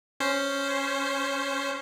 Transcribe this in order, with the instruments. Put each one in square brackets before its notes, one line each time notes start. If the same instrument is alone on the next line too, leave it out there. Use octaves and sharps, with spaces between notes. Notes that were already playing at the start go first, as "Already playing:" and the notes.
[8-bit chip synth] C#4 C5